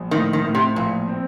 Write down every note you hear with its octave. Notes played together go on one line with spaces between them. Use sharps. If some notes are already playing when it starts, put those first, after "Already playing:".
Already playing: A#1
A2 D#3
D#3
A2
C3
A#1 A#2
C4